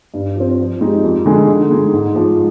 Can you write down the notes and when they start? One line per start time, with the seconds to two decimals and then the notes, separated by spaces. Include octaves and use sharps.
0.14 G2
0.36 F3 C4
0.59 F3
0.81 G#3 D#4 G4
1.04 F2
1.26 D3 G#3 D#4 G#4
1.48 D3
1.71 G#3 D#4
1.93 G#2
2.15 F3 G#3